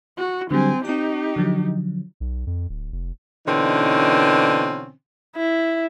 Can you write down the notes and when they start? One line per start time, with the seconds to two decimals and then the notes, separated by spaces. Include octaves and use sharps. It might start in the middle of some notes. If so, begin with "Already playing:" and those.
0.18 F#4
0.51 D3 F#3 G3 C4 G#5
0.85 C4 D#4 G4 G5
1.36 D3 F3 F#3
2.20 B1
2.47 F2
2.69 D1
2.92 F1
3.47 B2 D3 E3 C4 C#4 D#4
5.36 E4